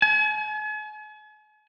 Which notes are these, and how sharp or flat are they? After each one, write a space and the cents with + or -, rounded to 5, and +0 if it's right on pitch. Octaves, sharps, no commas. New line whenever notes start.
G#5 +45